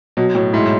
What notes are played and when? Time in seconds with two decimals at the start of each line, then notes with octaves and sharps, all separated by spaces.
0.17 B2 F#3
0.35 A2 F#3
0.53 G#2 E4